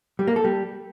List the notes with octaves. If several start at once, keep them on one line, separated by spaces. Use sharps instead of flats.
G3
A#3
A4
G3